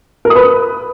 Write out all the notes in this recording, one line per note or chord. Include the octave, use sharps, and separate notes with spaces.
A#4
D#6
B4